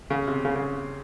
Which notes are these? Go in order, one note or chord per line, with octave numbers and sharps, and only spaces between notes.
C#3
C3
C#3
C#3